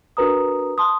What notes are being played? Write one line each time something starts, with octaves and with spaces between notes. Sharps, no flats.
D4 F#4 A#4 B4 A#5 D#6
A5 C6 D#6